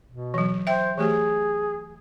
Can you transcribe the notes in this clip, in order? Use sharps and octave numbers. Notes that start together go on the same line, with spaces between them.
B2
E3 F#3
C5 E5 G5
E3 A3 G4 G#4